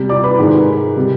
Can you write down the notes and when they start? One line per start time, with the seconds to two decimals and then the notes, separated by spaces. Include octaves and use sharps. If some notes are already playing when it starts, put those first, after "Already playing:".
Already playing: C3 G3
0.09 D5 D6
0.24 B4 B5
0.38 G#2 D#3 G#3
0.96 C3 G3